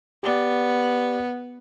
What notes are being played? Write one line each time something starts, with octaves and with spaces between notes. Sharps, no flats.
B3 G4 D5